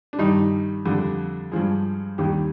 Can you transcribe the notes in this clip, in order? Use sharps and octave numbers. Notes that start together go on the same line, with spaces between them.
D4
G2 D#3 G3 D#4
F2 D3 G3
G2 F3 G#3
D#2 D#3 G3 G4